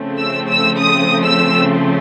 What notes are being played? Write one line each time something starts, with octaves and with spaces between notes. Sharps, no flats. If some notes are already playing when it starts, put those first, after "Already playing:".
Already playing: C#3 F3 A3 C4
E6
E6
D#6
E6